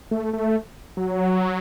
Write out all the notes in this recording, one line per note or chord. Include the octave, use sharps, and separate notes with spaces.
A3
A3
F#3